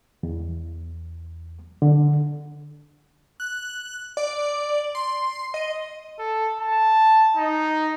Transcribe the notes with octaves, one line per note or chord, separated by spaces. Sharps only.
E2
D3
F#6
D5
C6
D#5
A4
A5
D#4